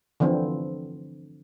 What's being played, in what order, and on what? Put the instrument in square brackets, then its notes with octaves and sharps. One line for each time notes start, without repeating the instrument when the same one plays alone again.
[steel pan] D3 E3 F3 C4